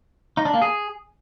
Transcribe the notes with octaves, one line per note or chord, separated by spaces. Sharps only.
D#4
D4
A#3
G#4